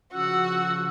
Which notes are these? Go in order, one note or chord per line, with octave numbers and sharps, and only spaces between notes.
C#3 F3 F#4 F#5 E6